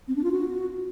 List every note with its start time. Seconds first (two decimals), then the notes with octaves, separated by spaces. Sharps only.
0.08 C4
0.16 D4
0.24 F4
0.32 F#4